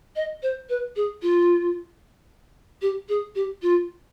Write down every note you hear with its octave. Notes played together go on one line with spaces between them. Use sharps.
D#5
C5
B4
G#4
F4
G4
G#4
G4
F4